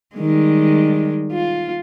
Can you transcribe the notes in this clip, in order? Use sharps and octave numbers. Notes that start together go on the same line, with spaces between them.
D#3 G3 G#3
F4